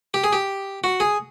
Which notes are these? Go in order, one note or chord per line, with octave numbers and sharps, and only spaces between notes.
G4
G#4
G4
F#4
G#4